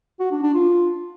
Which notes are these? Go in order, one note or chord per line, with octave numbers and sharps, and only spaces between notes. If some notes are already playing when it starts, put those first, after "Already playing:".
F#4
D4
D4
F4